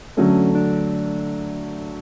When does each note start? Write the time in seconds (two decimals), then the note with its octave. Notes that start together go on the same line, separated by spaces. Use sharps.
0.17 D3 F#3 A3 C#4
0.55 D4